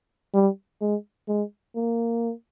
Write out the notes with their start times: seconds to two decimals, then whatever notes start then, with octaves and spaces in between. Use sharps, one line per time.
0.34 G3
0.81 G#3
1.28 G#3
1.76 A#3